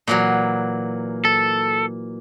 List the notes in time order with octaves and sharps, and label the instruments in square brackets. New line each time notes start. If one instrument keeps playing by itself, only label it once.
[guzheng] A#2 E3 F#3
[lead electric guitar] A4